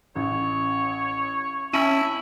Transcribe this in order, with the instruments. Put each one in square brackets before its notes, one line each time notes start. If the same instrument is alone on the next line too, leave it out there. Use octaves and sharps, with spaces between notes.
[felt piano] A1 [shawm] C#5
[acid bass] C#4 [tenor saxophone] E4 [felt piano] A5 C#6 D#7